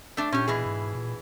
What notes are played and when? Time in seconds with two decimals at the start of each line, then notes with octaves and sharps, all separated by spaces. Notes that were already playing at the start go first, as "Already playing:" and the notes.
0.17 A3 D4
0.32 A#2 C#4 G4
0.48 B2 E3 G#4
0.66 G#2
0.95 A#2